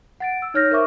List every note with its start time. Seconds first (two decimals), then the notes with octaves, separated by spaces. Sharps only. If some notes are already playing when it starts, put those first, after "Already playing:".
0.20 F#5 A6 D7
0.42 E6
0.54 D#4 C#5 F6 G6 A#6
0.71 A#4 C5 E5 C#6 D6 F6